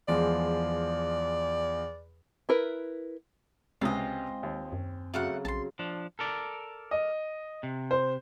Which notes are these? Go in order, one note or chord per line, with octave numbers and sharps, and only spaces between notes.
E2 F3 G#3 D5
E4 A#4 B4
C#2 C3 G#3 B3 C4 F4 D#5 G#5
D#2
F#2
C#3 F#3 A3 A#3 F#5
A#1 A5 C6
F3 D4
A4 A#4 D5
D#5
C3
C5